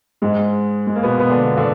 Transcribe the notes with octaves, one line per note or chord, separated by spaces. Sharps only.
G#2 G#3
G#3
A#3
B2 B3
B3
D3 D4
D3 D4